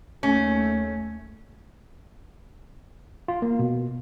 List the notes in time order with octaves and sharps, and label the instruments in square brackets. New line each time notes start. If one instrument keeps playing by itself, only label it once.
[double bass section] D#2 A3 [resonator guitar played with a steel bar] C#4
[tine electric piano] F4
A#3
B2